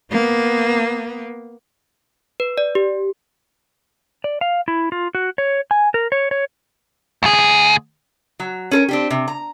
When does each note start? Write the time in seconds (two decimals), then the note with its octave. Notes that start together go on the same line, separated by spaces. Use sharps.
0.11 A#3 B3
2.40 B4
2.58 D5
2.75 G4
4.24 D5
4.41 F5
4.68 E4
4.92 F4
5.15 F#4
5.38 C#5
5.71 G#5
5.94 A#4
6.12 C#5
6.31 C#5
7.23 D2 G#4
8.40 F#3
8.71 C#4 A4 A#4
8.89 C4 D4 G4
9.10 C3
9.28 A#5